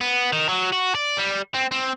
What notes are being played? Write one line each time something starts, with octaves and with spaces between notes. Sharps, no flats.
B3
D#3
F#3
F#4
D5
G3
C4
C4